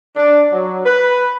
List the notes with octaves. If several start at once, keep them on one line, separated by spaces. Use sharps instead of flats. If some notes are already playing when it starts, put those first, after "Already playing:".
D4
F#3
B4